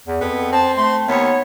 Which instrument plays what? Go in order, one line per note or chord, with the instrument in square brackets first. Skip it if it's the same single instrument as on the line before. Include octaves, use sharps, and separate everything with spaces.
[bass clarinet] E2
[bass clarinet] F2 [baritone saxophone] B3
[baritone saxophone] C4 [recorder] A5
[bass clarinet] A3 [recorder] C6
[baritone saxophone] D#2 [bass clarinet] B3 [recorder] C#5